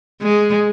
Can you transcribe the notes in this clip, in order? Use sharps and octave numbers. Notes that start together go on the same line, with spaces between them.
G#3